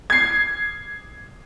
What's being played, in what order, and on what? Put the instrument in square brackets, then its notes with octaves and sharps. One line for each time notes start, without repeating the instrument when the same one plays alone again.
[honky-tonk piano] G#6 C7